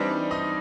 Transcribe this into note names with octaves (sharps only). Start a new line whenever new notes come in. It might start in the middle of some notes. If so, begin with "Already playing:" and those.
Already playing: E3 G3 C4 D4 D#4 D5
D#4 D#5